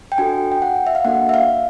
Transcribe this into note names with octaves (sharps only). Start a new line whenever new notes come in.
G5
D4 F#4 A4 G#5
G5
F#5
E5
F5
A#3 D4 F#4 A4 F#5
E5
F5